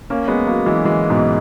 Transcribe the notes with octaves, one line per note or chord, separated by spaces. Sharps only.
A#3 C#4
G#3 B3
F#3 A#3
E3 G#3
E3 G#3
G#2 B2